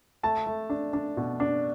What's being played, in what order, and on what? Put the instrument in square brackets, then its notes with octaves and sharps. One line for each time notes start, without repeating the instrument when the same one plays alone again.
[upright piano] A3 A5
A3
D4
D4
B2
D4